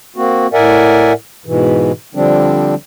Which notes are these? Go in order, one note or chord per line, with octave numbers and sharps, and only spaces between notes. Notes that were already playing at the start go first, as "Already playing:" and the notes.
A#3 C4 F#4
A2 A#4 D5 E5 F#5 G#5
G#2 B2 E3
D3 F3 G3 C4 D4